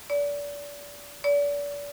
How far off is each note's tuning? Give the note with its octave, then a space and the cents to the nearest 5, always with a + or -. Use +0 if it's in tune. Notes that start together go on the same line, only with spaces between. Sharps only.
D5 -30
D5 -35